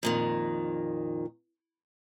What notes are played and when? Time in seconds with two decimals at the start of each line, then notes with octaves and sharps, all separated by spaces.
0.03 F2 A#2 D#3